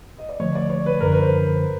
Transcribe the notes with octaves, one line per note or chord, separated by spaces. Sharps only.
D#5
D5
D3 F3 A3 C#5
D5
C#5
B4
F#2 D3 F3 A#4
B4
C5